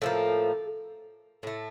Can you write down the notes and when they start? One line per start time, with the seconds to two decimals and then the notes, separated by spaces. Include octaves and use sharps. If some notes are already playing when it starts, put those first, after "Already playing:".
0.02 A2 F3 A#3 A4
1.43 A2 A3